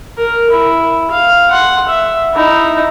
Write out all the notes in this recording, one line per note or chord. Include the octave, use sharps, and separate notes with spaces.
A#4
E4
F5
F#5 C6
E5
D#4 E4